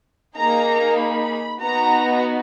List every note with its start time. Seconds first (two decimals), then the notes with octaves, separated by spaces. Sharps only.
0.35 A#3 D#4 G#4 A#5
0.98 B5
1.60 B3 D#4 F#4 A#5